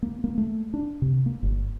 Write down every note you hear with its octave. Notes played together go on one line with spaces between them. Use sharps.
A#3
A#3
A3
D4
C3
A#3
G1